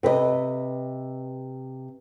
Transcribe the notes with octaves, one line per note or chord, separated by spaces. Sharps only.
C3 B4 C5 D#5